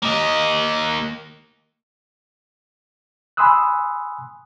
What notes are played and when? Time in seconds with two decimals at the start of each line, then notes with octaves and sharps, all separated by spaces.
0.02 A#3 D#5
3.37 G#5 B5 C6 D#6 E6 F#6